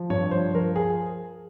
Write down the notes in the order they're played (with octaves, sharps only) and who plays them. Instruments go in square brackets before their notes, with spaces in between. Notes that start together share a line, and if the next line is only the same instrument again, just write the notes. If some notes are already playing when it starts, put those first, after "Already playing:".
Already playing: [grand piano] F3
G2 C#5
F3 C5
F3 A#4
G#4